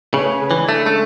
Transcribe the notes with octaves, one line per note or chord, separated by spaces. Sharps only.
C#3 A3 C#4 G#4 B4
C#3 E3 G#3 D4
A3
A3